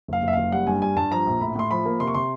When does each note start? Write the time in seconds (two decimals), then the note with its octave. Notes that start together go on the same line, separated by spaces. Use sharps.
0.08 F#1 F5
0.23 F#1
0.28 E5
0.33 F#1 F5
0.52 G3 F#5
0.67 G2 G#5
0.82 G3 G#5
0.96 G2 A5
1.11 F3 A#5
1.26 A#1
1.41 A2 B5
1.55 A2 C6
1.71 F3 B5
1.86 A#3
2.00 C3 C6
2.07 C#6
2.14 C3 C6